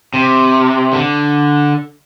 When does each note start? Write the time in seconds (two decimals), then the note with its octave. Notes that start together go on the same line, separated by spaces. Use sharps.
0.14 C3
0.93 D3